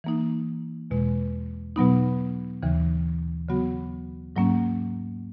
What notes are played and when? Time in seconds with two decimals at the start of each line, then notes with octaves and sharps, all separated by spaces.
0.04 E3 A#3 D#4
0.91 E2 B2 G#3
1.76 B2 F#3 B3 D#4
2.63 D#2 C#3 E3
3.49 C#3 F#3 B3 F#4
4.36 G#2 F#3 A#3 C#4